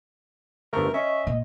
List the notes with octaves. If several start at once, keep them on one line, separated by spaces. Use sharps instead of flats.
G1 F3 A3 A#4
C#4 D#5 E5
A#2